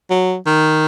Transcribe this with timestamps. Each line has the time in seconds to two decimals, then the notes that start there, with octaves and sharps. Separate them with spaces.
0.10 F#3
0.47 D#3